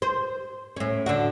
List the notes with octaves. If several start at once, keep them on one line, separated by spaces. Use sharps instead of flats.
C5
A2 C#4
D3 D4 F#4